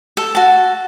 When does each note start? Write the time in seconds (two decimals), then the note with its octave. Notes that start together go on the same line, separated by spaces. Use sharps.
0.17 A4
0.35 F#4 A5